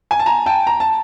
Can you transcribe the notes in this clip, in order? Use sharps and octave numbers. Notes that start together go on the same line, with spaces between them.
G#5
A5
G#5 A#5
G5 A5
A#5
A5